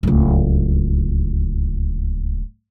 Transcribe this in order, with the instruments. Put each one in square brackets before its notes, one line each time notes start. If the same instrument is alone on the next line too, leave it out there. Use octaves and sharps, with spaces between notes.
[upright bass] D1 C#2